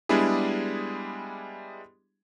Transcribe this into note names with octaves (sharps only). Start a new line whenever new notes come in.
G3 G#3 B3 D4 E4 G#4